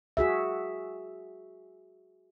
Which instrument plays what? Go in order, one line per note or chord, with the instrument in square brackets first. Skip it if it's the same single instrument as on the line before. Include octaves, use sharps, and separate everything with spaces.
[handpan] F#4 G#4 E5